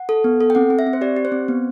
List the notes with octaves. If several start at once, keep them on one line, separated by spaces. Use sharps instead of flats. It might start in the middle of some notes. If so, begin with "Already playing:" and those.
Already playing: F#5
A4
B3
A4
G5
C4 F#5
C4
E5
C4
C5
G4 D5
G4
C5
C4
B3